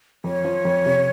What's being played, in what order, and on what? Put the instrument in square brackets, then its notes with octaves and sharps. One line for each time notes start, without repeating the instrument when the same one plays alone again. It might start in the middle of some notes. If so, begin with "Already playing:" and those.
[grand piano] F2 [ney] C#5
[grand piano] F3
F2
C3